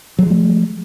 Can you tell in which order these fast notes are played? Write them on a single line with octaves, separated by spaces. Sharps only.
F#3 G#3 F3 A3